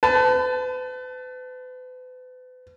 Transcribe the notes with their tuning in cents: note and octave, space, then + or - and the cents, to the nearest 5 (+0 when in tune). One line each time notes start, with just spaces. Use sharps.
B4 +40 A5 +0